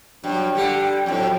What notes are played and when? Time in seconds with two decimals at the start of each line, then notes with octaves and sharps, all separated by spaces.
0.24 G2 F#3 G5
0.55 D3 G3 G4
1.06 F2 A2 F#3 G5